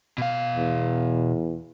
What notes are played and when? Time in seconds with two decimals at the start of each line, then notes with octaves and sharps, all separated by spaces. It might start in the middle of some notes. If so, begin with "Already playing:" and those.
0.18 B2 F5
0.56 E2